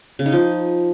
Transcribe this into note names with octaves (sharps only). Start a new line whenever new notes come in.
C#3
D#4
F3